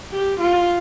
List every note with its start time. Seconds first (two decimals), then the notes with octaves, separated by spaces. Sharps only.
0.12 G4
0.40 F4